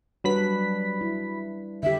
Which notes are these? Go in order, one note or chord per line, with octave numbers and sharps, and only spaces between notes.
F#3 G3 D4 B4 B5 B6
E4
D3 G4 E5